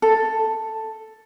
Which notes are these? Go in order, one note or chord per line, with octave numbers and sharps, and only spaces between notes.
A4